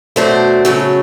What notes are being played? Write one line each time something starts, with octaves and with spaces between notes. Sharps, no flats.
B2 F#3 A3 D4 C5
C#3 F#3 A3 C#4